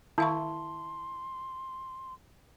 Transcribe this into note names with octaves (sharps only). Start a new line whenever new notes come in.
D#3 E4 F5 A5 C6 C#6